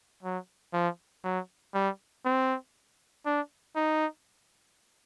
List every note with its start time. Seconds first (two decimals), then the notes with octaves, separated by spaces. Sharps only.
0.23 F#3
0.73 F3
1.24 F#3
1.74 G3
2.25 C4
3.26 D4
3.76 D#4